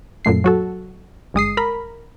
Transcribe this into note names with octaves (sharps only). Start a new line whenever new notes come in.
F#2 A#2 A3 C7
F#3 F#4 A4
G1 G#3 D#6 C7
A#4 B5